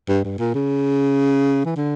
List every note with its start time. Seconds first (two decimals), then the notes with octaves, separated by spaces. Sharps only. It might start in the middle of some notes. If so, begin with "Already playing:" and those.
0.08 G2
0.24 G2
0.38 A#2
0.54 C#3
1.65 E3
1.76 D3